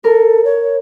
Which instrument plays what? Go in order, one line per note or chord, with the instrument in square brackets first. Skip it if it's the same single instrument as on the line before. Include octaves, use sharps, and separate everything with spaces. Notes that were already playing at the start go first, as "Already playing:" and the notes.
[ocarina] A4 [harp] A#4
[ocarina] C#5